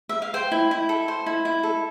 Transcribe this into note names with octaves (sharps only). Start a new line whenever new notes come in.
E5
F5
C5 G5
E4
E4
A4
C5
E4
E4
A4